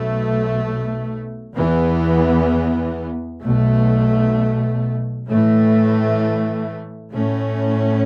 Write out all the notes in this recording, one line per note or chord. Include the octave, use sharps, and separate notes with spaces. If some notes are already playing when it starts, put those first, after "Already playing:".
Already playing: B1 B2 A3
E2 E3 B3
B1 B2 A3
A2 E3 A3
A2 A3 C#4